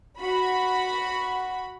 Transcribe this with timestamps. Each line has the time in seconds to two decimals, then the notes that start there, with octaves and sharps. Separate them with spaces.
0.19 F#4 B5